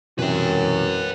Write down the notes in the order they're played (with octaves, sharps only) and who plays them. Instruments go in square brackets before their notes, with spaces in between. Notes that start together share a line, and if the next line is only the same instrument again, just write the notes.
[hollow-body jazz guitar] B1 C3 E3 [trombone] F#2 [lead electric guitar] B4 G5